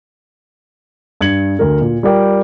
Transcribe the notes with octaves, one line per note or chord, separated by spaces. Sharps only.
G2 G#6 C#7 F#7
D2 A#4
A#2
G3 F4 A#4 D5 G5